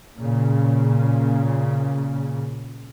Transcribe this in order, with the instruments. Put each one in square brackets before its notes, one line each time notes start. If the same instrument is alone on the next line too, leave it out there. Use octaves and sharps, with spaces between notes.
[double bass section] A#2 C#3